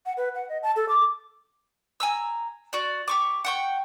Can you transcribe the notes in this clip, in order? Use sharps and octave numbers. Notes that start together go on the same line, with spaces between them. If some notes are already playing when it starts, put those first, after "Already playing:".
F#5
B4
F#5
D#5
A5
A4
D6
G#5 A#5 E6
F#4 D5
G4 C#6 D6
F#5 G5 C#6